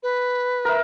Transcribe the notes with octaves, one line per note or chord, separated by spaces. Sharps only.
B4
A#4 E5